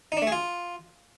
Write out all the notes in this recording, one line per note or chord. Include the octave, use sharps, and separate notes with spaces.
D#4
D4
A3
G#4
F4